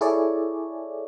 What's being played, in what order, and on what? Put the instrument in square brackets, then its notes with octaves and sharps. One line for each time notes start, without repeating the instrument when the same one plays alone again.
[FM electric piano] E4 G#4 A4 C#5 D5